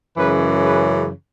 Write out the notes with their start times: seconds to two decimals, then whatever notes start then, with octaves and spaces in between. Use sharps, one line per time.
0.17 F#2 C#3 E3 G#3 B4
0.64 B4